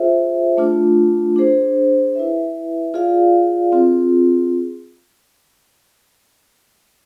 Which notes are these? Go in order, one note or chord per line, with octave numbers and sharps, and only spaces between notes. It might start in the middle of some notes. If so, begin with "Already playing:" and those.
Already playing: F4 G#4 C5 E5
A3 D4 F4
D4 G#4 C5
E4 B4 E5
F4 G#4 D5 F5
C4 F4 G#4